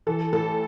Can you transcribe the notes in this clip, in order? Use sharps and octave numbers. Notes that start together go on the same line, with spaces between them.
E3 A4
A2 A4